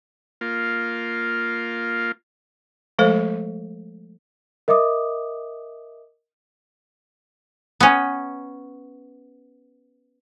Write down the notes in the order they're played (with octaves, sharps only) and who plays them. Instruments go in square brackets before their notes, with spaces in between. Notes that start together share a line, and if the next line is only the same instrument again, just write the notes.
[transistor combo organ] A#3 F4
[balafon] F3 G#3 A3 A4 C5
[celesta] A#4 D#5 E5 D6 D#6
[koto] B3 C#4